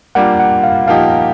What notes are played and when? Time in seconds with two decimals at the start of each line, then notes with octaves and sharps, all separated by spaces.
0.15 G3 A#3 D4 F4 F#5
0.40 F#5
0.64 F5
0.87 F3 A#3 D#4 G4 F5